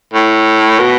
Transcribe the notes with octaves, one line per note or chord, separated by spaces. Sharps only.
A2
B2